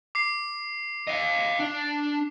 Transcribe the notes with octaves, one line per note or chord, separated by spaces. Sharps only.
D6 C7
D#5 F5
D4